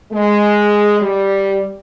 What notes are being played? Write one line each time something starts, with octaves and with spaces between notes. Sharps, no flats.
G#3
G3